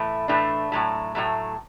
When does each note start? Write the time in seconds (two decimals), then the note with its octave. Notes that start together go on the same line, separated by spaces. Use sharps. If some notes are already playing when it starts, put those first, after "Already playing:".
Already playing: A2 E3 A3
0.28 A2 E3 A3 D4
0.72 A2 F#3 A3
1.15 A2 F#3 A3